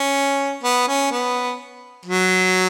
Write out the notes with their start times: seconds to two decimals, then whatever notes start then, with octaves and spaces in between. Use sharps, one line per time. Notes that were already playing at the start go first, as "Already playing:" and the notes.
Already playing: C#4
0.63 B3
0.88 C#4
1.11 B3
2.06 F#3